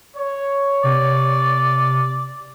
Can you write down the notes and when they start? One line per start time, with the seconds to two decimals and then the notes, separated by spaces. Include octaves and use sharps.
0.16 C#5
0.84 C3 D5